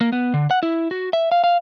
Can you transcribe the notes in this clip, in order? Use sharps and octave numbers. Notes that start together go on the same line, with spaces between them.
A#3
B3
D3
F#5
E4
F#4
E5
F5
F5